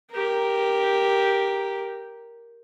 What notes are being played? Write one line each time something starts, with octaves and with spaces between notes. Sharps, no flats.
G4 A#4